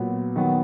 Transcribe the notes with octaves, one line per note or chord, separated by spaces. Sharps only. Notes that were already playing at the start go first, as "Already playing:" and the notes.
Already playing: A#2 F#3 B3
D#3 F#3 B3